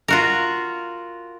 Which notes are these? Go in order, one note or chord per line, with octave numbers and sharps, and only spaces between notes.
F4 F#4 A#4